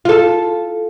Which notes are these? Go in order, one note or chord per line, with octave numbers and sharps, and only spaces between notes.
F4 A4